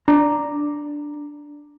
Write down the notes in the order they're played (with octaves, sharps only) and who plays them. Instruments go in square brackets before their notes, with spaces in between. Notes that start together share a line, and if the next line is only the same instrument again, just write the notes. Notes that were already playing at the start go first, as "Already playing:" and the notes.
[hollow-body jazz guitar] D4 A#5